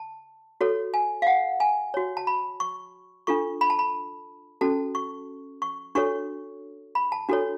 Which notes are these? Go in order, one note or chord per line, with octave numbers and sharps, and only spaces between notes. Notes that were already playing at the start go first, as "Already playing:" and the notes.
Already playing: A5
F#4 A4 C#5
G#5
F5
F#5
G#5
F#4 C#5
A5
B5
C#6
D4 F4 A4 C#6
B5
A5
B5
C#4 F#4 A4 A5
C#6
C#6
D4 F#4 A4 C#5 C#6
B5
A5
D4 F#4 A4 C#5